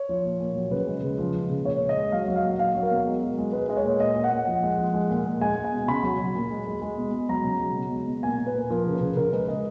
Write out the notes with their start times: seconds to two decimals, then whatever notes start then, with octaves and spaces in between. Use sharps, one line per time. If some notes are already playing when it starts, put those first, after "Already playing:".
Already playing: C#5
0.09 F3
0.24 A#2
0.40 A#2
0.56 F#3
0.71 C#3 B4
0.87 G#3
1.03 C#3
1.18 F3
1.34 G#3
1.50 C#3
1.65 A#2 C#5
1.81 G#3
1.89 D#5
1.97 G#3
2.12 F#3 F5
2.28 F#3
2.36 F5
2.43 A#2
2.59 F#3 F5
2.75 F#3
2.83 A#4
2.91 B2
3.07 G#3
3.22 G#3
3.38 G#3
3.53 G#3 B4
3.69 G#3 D#5
3.77 C#5
3.85 A#2
4.00 A#2 D#5
4.15 A#2
4.24 F#5
4.31 A#2
4.47 F3
4.63 G#3
4.78 F3
4.94 G#3
5.10 A#2
5.25 A#2
5.41 G#3 G#5
5.57 G#3
5.64 G#5
5.72 B2
5.88 C#3 B5
6.03 F#3
6.19 F#3
6.35 A#2
6.51 G#3
6.67 G#3
6.82 G#3
6.98 B2
7.14 G#3
7.29 F#3 A#5
7.45 C#3
7.60 F#3
7.76 B2
7.92 G#3
8.07 B2
8.23 A#2 G#5
8.39 A#2
8.46 B4
8.54 A#2
8.70 F3 A#4
8.86 C#3
8.93 B4
9.01 C#3
9.16 C#3 A#4
9.32 G#3 B4
9.48 G#3 D#5